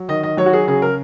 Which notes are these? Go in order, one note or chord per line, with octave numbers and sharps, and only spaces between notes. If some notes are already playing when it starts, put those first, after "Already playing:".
Already playing: F#3
D#3 D#5
D#5
F#3 C#5
F#4
G#4
C#3 G#4
A#4